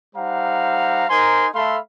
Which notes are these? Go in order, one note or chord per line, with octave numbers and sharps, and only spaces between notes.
G3 D#4 C5 F5 F#5 A#5
D#4 A#4 C5 G#5 C6
A3 A4 E5 F5 B5 C6